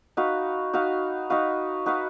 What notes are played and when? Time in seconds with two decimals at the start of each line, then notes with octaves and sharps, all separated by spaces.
0.17 D#4 F#4 B4 F5
0.73 D#4 F#4 B4 F5
1.30 D#4 F#4 B4 F5
1.86 D#4 F#4 B4 F5